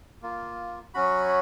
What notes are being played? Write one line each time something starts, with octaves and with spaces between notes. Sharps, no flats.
A#3 F4
F#3 C#4 F#4 B5